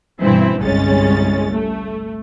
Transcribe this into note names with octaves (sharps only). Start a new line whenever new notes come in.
G2 B2 E3 C4 E4
G1 C2 G3 G#3 C#4 A6
A3